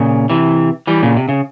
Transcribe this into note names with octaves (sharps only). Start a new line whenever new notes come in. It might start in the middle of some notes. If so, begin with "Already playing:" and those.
Already playing: A#2 C#3
C3 E3
E3 G3
A#2 C#3
C3
C#3